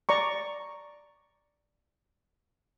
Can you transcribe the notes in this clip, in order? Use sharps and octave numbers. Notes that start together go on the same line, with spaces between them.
D5 A#5 C#6